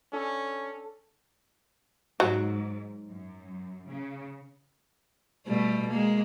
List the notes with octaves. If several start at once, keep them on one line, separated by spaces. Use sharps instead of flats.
C#4 D4 A4
G#2 F#3
F#2
C#3
B2 G3 A3
G#3 A#3